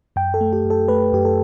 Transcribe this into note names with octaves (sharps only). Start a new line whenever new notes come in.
F#2 G5
A4
A3
G4
F#2
A4
A3 B4
F#2 G4
A4